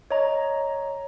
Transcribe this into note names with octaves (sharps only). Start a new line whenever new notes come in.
C#5 D#5 A#5